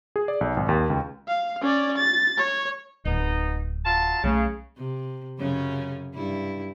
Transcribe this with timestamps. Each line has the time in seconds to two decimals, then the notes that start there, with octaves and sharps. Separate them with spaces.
0.16 G#4
0.28 D5
0.41 B1
0.57 G#1
0.69 D#2
0.90 C#2
1.28 F5
1.62 C#4 D5
1.98 A6
2.38 C#5
3.05 D1 B3 D#4
3.85 F#3 F4 A5
4.24 B1 C#3 G3 A3
4.77 C3
5.38 F#2 C#3 C#4
6.14 G2 E4